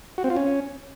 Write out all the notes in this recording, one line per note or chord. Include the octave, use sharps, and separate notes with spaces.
F#4
C4
F4
C#4